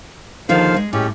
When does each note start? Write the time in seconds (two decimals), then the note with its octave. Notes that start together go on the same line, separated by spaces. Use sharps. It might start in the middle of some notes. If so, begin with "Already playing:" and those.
0.49 D#2 D3 D#3 F3 C5 F5
0.76 G#3
0.93 A2 G#3 C#4 G4